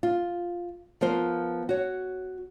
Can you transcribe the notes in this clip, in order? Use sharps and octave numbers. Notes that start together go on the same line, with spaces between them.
F4
F3 B3 A#4 C5
F#4 C#5